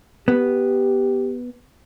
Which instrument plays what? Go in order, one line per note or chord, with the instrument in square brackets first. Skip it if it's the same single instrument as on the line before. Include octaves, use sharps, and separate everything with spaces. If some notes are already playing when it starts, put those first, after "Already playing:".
[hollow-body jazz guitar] B3 [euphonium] G4